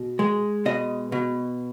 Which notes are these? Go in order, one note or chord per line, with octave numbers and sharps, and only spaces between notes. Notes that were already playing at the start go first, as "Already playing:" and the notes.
Already playing: B2
G#3
B2 D#5
B2